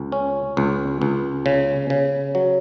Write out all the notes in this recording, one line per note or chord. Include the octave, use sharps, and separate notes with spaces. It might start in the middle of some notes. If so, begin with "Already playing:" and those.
Already playing: C#2
C#4
C#2
C#2
C#3
C#3
F#3